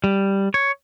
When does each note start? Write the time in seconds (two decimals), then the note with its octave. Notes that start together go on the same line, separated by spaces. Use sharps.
0.04 G3
0.54 C#5